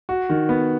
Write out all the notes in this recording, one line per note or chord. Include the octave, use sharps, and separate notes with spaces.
F#4
D#3
B3